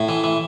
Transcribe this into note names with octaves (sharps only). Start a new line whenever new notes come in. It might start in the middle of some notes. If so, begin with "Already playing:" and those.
Already playing: A2
E3
E3